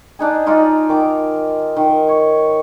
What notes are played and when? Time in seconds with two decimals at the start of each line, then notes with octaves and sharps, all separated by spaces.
0.19 D4 D#4 G#4
0.46 D#4 F4 D5 A#5
0.89 D#3 D6
1.77 D#3
2.08 C#5